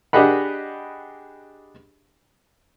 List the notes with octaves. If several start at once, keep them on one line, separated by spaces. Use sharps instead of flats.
D4 G4 G#4 D#5 F#5 B5